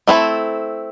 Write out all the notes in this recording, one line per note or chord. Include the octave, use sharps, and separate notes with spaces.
A3 C4 E4 A4